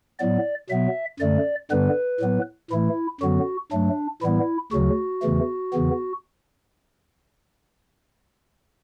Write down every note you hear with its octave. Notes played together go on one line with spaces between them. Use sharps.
A2 F#3 B3 D5
B2 F#3 B3 E5
F#2 D3 A3 D5
G2 D3 G3 B3 B4
A2 F#3 B3
A2 E3 A3 E4
F#2 D3 F#3 B3 F#4
G2 F#3 A3 D4
A2 E3 G3 B3 E4
D2 C#3 F#3 F#4
E2 C#3 E3 A3
E2 C#3 E3 B3